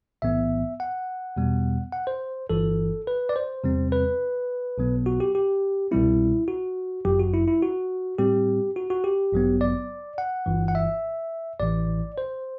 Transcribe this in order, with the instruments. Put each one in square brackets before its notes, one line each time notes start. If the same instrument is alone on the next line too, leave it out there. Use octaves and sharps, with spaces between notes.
[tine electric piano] B1 A2 E3 B3 E5
F#5
E2 B2 G3 B3
F#5
C5
G1 G2 E3 A4
B4
D5
C5
E2 C3 G3 C4
B4
B1 B2 F#3 B3
F#4
G4
G4
C2 B2 G3 C4 E4
F#4
G1 F#2 F#3 G4
F#4
E4
E4
F#4
A2 G3 C4 G4
F#4
F#4
G4
A1 G2 F#3 B3
D5
F#5
G1 G2 E3
F#5
E5
A1 A2 E3 D5
C5